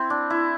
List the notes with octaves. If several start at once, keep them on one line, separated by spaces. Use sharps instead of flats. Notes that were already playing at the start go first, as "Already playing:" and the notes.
Already playing: C4 E4
D4
E4